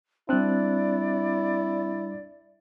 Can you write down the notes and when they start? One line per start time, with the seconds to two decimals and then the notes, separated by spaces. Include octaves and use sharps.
0.29 G3 C4 D4 E4 D5 F#6